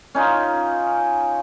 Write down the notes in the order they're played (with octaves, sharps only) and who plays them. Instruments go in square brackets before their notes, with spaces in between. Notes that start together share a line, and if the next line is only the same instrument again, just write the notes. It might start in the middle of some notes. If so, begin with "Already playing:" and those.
[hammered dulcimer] C#4 D#4 F4